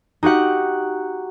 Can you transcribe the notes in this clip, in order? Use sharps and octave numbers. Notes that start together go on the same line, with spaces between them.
D#4 F#4 G4 F#5